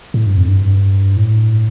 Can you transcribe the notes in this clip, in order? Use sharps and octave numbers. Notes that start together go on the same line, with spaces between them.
A2
G2
F2
G2
A2